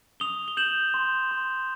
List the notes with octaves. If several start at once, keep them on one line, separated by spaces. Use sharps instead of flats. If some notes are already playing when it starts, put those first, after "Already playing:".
D#6 F7 G7
G7
G6 E7 F#7
C6
C6